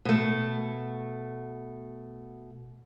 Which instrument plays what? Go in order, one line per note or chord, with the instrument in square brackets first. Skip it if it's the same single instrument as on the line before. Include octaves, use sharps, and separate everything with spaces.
[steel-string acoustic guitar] B2 A3